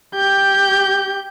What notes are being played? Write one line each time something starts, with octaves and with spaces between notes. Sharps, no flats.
G4 G6